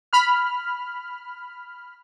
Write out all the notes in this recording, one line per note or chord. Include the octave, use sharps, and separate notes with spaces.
B5 F6